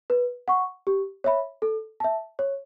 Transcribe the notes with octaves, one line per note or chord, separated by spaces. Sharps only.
B4
F#5 C#6
G4
C#5 E5 B5
A4
E5 A5
C#5